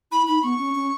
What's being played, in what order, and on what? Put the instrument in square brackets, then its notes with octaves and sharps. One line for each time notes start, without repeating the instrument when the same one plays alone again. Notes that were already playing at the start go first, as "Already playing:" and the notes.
[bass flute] E4 [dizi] B5
[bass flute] D#4 [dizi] B5
[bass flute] B3 [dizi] C#6
[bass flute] C#4
C#4